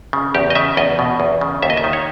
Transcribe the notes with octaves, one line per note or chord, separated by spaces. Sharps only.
C#3
E2 G4
D#5
C#3 E5
E2 D#5
B2
E2
C#3
D#2 E5
D#5
E5
D#3
C#5